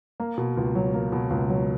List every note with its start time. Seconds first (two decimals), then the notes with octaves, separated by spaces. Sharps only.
0.20 A#3
0.38 B2
0.57 C#2
0.75 F#3
0.94 A#3
1.12 B2
1.30 C#2
1.50 F#3